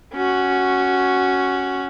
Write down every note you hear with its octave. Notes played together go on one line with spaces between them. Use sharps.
C#4 F#4